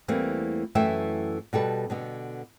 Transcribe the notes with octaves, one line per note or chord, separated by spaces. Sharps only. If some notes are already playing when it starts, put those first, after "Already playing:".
E2 E3 G3 A3 A#3 C4
F#2 E3 A3 E4 E5 G5
B2 G3 A4 B4
B2 D3 B3